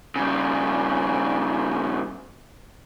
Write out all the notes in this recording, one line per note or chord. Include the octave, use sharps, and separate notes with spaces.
G2 C#3